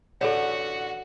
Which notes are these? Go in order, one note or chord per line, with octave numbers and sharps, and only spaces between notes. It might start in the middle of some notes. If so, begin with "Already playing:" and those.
A1 D3 F#4 A4 C#5 F#5